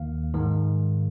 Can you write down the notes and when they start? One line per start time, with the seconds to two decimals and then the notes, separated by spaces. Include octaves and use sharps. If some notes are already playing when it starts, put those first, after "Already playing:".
Already playing: D#2 D#3 A#3 F5
0.34 G#2 D#3 G#3